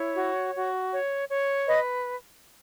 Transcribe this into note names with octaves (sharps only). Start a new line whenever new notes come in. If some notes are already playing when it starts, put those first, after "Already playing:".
Already playing: E4 C#5
F#4
F#4
C#5
C#5
B4 D#5